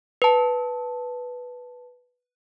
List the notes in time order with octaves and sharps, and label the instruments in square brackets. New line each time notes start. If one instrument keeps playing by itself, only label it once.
[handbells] B4 A5